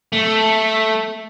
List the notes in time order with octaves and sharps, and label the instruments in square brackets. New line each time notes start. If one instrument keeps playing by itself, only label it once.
[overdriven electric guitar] A3